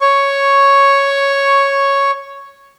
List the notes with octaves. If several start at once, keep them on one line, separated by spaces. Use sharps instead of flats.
C#5 C#6